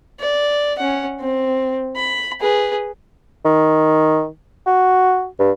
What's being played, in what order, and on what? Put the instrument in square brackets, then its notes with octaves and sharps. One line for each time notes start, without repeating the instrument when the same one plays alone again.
[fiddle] D5
C#4 F#5
C4
B5
G#4 B4
[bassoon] D#3
F#4
G2